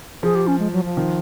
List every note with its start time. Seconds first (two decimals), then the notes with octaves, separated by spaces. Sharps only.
0.23 F3 G#4
0.35 G4
0.47 C#4
0.59 G#3
0.72 F#3
0.84 F3
0.97 D#3